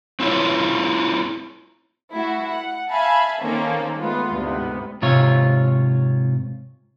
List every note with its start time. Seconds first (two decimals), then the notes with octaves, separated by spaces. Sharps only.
0.20 C4 E4 F4 C#5
2.12 A3 E4 F#4
2.46 F#5
2.91 E5 F5 G#5 A5 B5
3.40 D#3 A#3 C4 C#4 D#4 A4
3.96 G#3 A3 B3 F4
4.34 D2 G#2 C3 B3
5.02 G#2 C3 F4 C#5